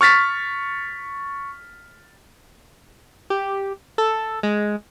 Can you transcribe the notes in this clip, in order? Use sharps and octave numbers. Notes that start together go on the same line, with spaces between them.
C#6 F6 A6 B6
G4
A4
G#3